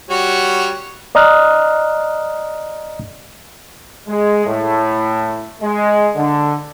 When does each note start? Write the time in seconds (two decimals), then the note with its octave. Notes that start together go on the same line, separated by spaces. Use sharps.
0.10 G3 F#4 C#5
1.15 D5 D#5 A#5 D#6 F6 F#6
4.07 G#3
4.46 A2
5.62 G#3
6.16 D3